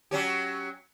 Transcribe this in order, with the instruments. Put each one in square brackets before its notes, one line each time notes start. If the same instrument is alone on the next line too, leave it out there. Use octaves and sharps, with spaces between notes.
[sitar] F#3 C#4 G4